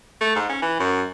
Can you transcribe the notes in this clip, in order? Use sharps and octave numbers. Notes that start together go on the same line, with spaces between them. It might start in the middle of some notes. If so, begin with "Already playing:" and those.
A3
G#2
C#4
E3
F#2